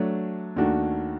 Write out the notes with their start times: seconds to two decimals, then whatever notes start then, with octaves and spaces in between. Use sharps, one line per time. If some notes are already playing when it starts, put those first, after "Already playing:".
Already playing: F#3 A3 D4
0.56 D#2 D#3 A3 D4 F#4